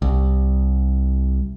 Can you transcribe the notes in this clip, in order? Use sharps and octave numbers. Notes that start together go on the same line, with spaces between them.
C2